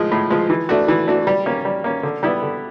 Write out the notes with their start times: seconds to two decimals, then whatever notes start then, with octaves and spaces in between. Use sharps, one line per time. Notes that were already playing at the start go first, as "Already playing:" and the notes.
Already playing: A2 F3 G#3
0.12 A2
0.30 F3 G#3
0.50 E3
0.69 A3 D4 F#4
0.88 E3
1.07 A3 D4 F#4
1.27 G3
1.46 A#3 C#4
1.65 G3
1.84 A#3 C#4
2.03 D3
2.23 G3 B3 E4
2.42 D3